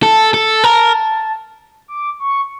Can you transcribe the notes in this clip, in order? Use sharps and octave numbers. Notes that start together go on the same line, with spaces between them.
A4 A5
A4
A#4
D6
C#6